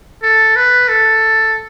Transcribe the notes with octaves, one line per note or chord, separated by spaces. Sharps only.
A4
B4
A4